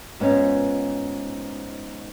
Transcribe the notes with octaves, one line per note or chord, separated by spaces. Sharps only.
G#2 B3 C#4 F4